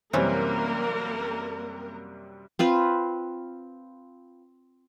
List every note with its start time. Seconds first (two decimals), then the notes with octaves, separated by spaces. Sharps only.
0.13 F#2 C3 E3 G3 A#3 C4 C#4 A#4
2.59 C4 F4 B4